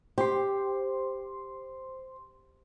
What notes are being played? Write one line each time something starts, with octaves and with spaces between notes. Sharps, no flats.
G4 C5 C6